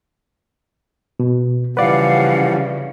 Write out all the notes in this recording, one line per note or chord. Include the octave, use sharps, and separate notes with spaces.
B2
C#3 E3 F3 G3 B4 D5 F5 F#5